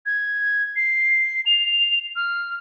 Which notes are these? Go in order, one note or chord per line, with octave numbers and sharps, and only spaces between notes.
G#6
C7
F7
F6